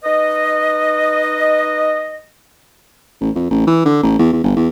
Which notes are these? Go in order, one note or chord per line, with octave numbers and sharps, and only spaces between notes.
D#4 B4 D#5
A1
F2
A1
E3
D3
A1
E2
E2
G1
E2